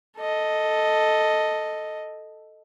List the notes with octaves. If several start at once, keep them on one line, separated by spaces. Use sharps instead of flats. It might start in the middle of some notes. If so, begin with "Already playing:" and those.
A4 D#5